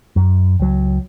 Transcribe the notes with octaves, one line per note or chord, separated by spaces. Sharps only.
F#2
C#2 F#3